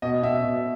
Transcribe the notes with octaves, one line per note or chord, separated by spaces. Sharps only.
B2 D#5
B2 E5
B2